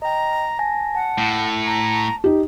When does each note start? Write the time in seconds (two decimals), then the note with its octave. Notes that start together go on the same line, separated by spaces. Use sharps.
0.02 D#5 G5 A#5
0.59 G#5 A5 A#6
0.95 F#5 A5
1.18 A2
1.66 A#5
2.24 D#4 G4